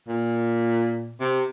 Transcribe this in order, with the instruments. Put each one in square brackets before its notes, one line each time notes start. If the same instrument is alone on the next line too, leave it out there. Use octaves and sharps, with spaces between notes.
[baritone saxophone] A#2
C3